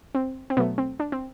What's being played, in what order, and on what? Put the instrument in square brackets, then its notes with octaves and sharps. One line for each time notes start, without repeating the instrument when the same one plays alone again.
[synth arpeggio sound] C4
C4
B2 F#3 A3 B3
C4
D4
C4